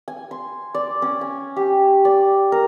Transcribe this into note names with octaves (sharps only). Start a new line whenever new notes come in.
G#5
C6
D5
C#4
G#5
G4
D5
A#4